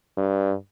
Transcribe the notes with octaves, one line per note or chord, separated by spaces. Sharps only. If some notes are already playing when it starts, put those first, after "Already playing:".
G2